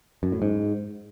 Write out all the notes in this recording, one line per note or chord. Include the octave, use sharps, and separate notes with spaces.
F#2
A2
G#2